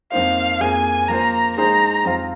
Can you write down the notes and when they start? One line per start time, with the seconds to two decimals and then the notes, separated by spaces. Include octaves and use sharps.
0.12 F2 F3 A#3 D#4 C5 F5
0.60 F2 F3 A#3 G#4 G#5
1.08 F3 A#3 F4 C5 A#5
1.56 G#3 D#4 G#4 C5 A#5
2.05 F2 F3 C4 F4